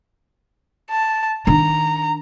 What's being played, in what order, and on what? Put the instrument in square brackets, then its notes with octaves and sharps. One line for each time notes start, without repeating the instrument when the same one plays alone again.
[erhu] A5
[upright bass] D#3 D4 [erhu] A#5